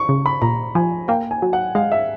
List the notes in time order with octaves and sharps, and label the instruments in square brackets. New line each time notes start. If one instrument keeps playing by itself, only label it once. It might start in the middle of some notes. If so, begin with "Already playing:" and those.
Already playing: [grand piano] C#6
[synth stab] C#3
[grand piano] B5
[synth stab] A#2 [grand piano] A#5
[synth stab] F3 [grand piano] G#5
[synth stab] A#3 [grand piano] G5
[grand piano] G#5
[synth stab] F#3
[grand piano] F#5
[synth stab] G#3 [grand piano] F5
[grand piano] E5